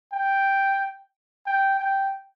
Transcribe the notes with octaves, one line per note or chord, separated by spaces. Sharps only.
G5
G5
G5